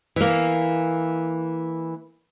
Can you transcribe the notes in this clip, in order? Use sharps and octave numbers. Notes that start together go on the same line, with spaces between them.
E3 A#3